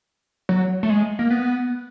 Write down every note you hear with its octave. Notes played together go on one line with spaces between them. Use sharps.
F#3
A3
G#3
A#3
B3